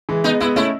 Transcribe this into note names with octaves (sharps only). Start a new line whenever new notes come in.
E3 G#3
G#3 B3 D#4
G#3 B3 E4
A3 C#4 E4